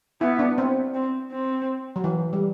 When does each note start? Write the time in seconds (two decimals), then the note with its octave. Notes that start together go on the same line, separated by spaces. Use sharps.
0.21 B3 E4
0.39 D4
0.58 C4
0.94 C4
1.32 C4
1.96 F#3
2.04 E3
2.33 G3